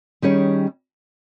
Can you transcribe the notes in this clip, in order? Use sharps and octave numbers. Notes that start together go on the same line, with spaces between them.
D#3 G3 C#4 G#4 C#5